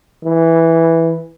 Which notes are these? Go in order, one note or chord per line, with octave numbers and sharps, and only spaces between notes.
E3